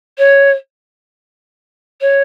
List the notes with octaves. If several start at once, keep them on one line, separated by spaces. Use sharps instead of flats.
C#5
C#5